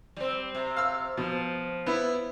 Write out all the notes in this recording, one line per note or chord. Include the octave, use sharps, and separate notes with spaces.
G3 C4
C3
F5 E6
B2 F3
B3 E4